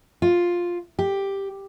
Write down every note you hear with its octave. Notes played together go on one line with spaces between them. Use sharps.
F4
G4